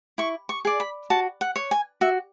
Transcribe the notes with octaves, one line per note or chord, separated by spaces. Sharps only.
E4 C#6
C#6
G#4 D5
B5
F#4 A5
F#5
C#5
G#5
F#4 E5